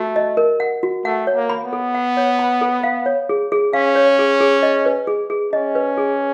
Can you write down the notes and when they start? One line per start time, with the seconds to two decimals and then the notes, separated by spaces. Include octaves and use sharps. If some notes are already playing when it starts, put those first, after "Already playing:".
Already playing: A3 F#4
0.16 D#5
0.37 A#4
0.60 F#5
0.83 F#4
1.05 A3 F#5
1.27 C#5
1.34 A#3
1.49 B5
1.65 B3
1.73 A4
1.95 F#5
2.17 C#5
2.39 B5
2.61 A4
2.83 F5
3.06 C#5
3.29 G#4
3.52 G#4
3.73 C#4 F5
3.95 C#5
4.19 G#4
4.41 G#4
4.63 D#5
4.86 B4
5.07 G#4
5.30 G#4
5.53 C#4 D#5
5.75 B4
5.98 G#4